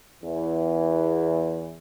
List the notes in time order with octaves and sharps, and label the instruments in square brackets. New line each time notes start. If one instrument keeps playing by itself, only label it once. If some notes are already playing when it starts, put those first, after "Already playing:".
[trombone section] E2 E3